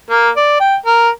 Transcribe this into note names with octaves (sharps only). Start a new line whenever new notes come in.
A#3
D5
G5
A#4